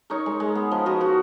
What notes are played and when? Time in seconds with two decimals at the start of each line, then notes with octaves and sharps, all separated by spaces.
0.10 D#4 A#4 C#5
0.26 G#3
0.40 G#3
0.55 B3
0.71 F3
0.86 F3 F#4 A#4
1.01 F3 F#4